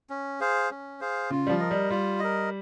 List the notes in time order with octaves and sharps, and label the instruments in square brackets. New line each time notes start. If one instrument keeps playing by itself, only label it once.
[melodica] C#4
G#4 C5 F5
C#4
G#4 C5 F5
[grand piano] C#3 [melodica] F4
[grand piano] G3
F3
[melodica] A#4 D#5
[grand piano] G3
[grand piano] G3 [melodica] F4
[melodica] A#4 D#5